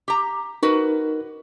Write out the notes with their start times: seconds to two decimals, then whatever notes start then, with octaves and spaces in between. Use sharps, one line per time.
0.08 G4 A#5
0.63 D#4 F#4 A#4 B4